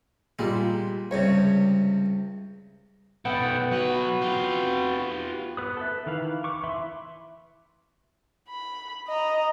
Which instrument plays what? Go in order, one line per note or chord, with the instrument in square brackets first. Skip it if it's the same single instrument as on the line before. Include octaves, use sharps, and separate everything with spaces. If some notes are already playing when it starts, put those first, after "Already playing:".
[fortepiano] A#2 G3 [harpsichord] G#3
[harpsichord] C#2 G2 C3 [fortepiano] C#5
[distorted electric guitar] B1 A3 [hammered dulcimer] B3 [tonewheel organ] F#5 G5
[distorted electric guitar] F#3 B4 [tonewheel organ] F#4
[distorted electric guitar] F4 G4
[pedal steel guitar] B3 B4 D#6
A4 B4 E5
D#3 E3 B4 F5
C#6 D6
E3 E5 B5 C6
[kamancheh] B5
D#5 A#5